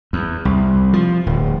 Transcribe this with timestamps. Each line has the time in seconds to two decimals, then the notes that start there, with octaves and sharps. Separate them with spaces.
0.13 E2
0.45 C2
0.93 F3
1.26 D1